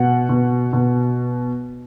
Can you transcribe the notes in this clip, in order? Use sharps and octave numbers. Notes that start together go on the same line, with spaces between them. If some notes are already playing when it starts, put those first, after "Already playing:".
Already playing: B2 F#5
B2
B2